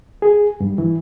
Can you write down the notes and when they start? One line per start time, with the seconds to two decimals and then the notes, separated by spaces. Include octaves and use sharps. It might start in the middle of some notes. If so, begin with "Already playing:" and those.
0.22 G#4
0.60 G2
0.78 E3